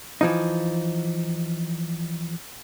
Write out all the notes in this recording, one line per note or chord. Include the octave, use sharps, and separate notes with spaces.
E3 F3 D#4